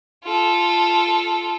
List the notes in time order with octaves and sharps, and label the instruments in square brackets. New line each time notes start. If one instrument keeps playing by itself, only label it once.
[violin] F4 A4